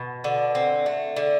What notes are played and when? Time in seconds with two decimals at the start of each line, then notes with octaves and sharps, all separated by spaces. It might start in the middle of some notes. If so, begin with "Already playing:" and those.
Already playing: B2
0.24 D3
0.55 C4
0.86 A3
1.16 D3